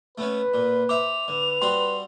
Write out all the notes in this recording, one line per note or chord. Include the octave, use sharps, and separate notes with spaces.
A3 B3 C#4 B4
A#2
C5 E5 D6 F7
D3 B4
G3 C4 F#4 C6